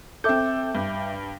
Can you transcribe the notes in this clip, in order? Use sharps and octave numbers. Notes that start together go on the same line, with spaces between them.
C4 A4 E5 D6 G6
G2